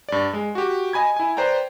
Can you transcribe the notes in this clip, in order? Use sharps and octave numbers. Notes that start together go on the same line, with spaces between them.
G2 D5
G#3
F#4 G4
D#5 G#5 B5 G#6
E4 G#5
B4 C5 D5 G5 A#5